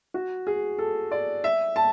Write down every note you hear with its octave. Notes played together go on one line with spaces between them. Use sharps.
F#4
G#4
A4
D5
E5
A5